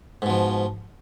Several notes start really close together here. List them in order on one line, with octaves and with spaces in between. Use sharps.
G#2 B2 F3